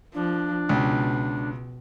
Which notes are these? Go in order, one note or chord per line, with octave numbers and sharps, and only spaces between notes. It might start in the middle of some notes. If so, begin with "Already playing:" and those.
F3 D4
C#2 B2